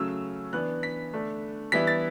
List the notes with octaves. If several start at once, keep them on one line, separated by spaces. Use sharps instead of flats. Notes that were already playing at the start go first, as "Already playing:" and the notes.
Already playing: C#3 F#3 A3 C#4 E6
E3 B3 D4 F#6
B6
D3 A3 D4
E3 G3 B3 E4 B6
A6